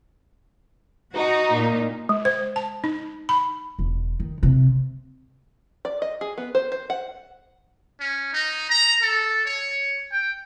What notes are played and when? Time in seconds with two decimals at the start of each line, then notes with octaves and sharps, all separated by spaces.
1.16 D#4 F#4
1.56 A#2
2.09 G#3
2.25 C5
2.56 A5
2.84 D#4
3.29 B5
3.79 E1
4.20 D#3
4.43 C3
5.85 D5
6.02 D#5
6.21 G#4
6.38 B3
6.55 C5
6.72 C5
6.90 F#5
8.00 C#4
8.33 D#4
8.70 A#5
9.02 A4
9.45 C#5
10.12 G5